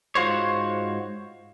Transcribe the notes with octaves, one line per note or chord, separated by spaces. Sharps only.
G#2 F4 F#4 C5 C#5